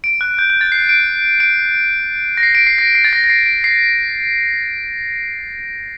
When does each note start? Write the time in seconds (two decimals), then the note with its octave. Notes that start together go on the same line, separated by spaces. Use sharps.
0.04 D7
0.21 F#6
0.39 G6
0.50 G6
0.61 A6
0.72 C7
0.89 D7
1.40 D7
2.37 A#6
2.43 C7
2.55 D7
2.67 C7
2.78 A#6
2.95 C7
3.04 A6
3.13 A#6
3.24 A#6
3.30 C7
3.46 D7
3.64 C7